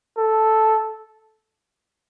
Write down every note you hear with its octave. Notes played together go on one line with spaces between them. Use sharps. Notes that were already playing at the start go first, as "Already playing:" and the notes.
A4